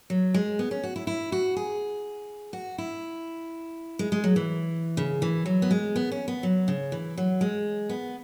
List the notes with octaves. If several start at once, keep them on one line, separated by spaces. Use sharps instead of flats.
F#3
G#3
B3
C#4
F#4
E4
E4
F#4
G#4
F#4
E4
G#3
G#3
F#3
E3
C#3
E3
F#3
B3
G#3
B3
C#4
B3
F#3
C#3
E3
F#3
G#3
B3